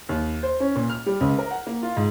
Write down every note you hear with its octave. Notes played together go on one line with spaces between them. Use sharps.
D#2
C5
C#4
A#2
F6
G3
C#2
A#4
F#5
A#3
F4
G#2